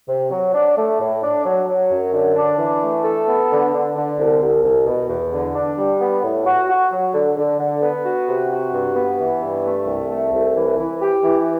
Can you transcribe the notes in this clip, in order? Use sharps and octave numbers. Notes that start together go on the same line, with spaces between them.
C3
F#3
D4
A3
A2
D4
F#3
F#3
F#2
D3
D4
E3
A3
A4
B3
D3
D3
D3
C2
C2
C2
B2
E2
D3
D4
G3
B3
A2
F#4
F#4
F#3
D3
D3
D3
B3
F#4
C3
F#4
G2
B3
E3
G2
A3
C2
A3
C2
E3
E3
G4
E3